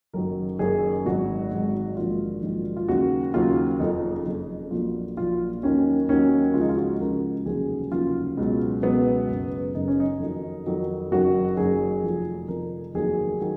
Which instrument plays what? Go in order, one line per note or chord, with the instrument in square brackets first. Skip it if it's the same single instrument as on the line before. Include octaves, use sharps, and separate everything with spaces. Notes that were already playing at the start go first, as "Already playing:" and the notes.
[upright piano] F#1 F#2 D#3 F#3 A#4
F#1 F#2 D#3 F#3 G#4
G#1 G#2 F#3 F#4
G#1 G#2 F#3
A#1 G#2 D#3 F#3 F4
A#1 G#2 D#3 F#3
F4
D#2 C#3 F#3 F#4
D#2 C#3 F#3 F4
F#1 F2 F3 D#4
F#1 F2 F3
A#1 A#2 F#3 F4
A#1 A#2 F#3 F4
D#2 D#3 F#3 C#4
D#2 D#3 F#3 C#4
C#2 C#3 F3 F4
D#4
F4
F#4
C#2 C#3 F3 A#4
F1 D#2 C#3 F#3 G#4
F1 D#2 C#3 F#3 F4
C#2 B2 F#3
C#2 B2 F#3 B3
F#1 F#2 C#3
F#1 F#2 C#3 D#4
C#4
D#4
F2 D#3 F#3
F2 D#3 F#3
F#1 F#2 D#3 F#3 F#4
F#1 F#2 D#3 F#3 G#4
F1 F2 F3
F1 F2 F3 A#4
F1 D#2 D#3 F#3 G#4
D#3 F#3